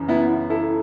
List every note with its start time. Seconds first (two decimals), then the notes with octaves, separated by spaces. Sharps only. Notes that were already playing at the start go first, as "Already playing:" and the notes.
Already playing: F#2 C#3 E3
0.08 B3 E4
0.50 E4 A4